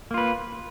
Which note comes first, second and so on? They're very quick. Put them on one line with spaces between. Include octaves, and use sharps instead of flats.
A#3 F4 B4